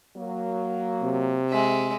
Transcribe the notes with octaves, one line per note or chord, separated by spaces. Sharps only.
F#3 A#3
C3
G#3 E5